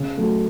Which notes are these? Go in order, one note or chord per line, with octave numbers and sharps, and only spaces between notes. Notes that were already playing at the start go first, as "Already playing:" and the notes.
Already playing: C#3
F#3 A3